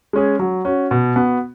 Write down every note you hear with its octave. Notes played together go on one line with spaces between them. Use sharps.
G#3 C#4 G#4
F#3
C#4 F#4
B2
B3 F#4